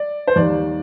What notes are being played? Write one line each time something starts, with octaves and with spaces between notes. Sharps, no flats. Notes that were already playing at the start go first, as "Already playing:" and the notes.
Already playing: D5
C5
D#2 D#3 G3 D5